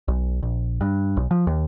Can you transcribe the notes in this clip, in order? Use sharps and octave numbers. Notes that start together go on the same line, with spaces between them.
B1
A#1
G2
B1
F3
D#2